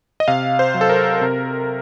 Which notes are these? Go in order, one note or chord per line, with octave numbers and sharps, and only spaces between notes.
D#5
C3 F5
C5
F#3
A4
A#4
C3